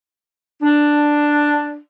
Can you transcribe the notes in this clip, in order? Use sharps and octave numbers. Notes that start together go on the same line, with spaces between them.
D4